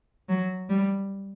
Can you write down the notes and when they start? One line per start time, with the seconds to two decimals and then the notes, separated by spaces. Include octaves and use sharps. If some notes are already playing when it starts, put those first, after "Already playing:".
0.29 F#3
0.69 G3